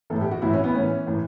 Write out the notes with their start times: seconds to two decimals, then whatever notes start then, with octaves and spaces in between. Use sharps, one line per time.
0.10 A2 E3 A4
0.21 G4
0.31 F#4
0.42 A2 E3 E4
0.53 C#4
0.64 B3
0.75 A2 E3 C#4
1.07 A2 E3